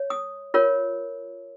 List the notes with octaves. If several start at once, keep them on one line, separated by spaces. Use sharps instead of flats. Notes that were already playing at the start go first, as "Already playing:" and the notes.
Already playing: C#5
D#6
F4 A#4 C#5